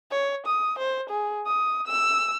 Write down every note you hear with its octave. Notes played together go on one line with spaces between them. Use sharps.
C#5
D#6
C5
G#4
D#6
E6